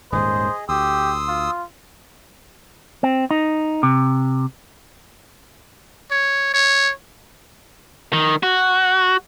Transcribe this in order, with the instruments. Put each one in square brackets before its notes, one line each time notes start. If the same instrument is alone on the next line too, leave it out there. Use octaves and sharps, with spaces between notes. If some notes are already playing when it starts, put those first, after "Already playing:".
[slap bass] D#1 G#2 D#3 [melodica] G#4 D#5 [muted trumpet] C5
[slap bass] D2 [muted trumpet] G4 [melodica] C6 D#6 E6
[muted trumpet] F4
[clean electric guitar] C4
D#4
C3
[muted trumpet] C#5
C#5
[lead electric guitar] D#3
F#4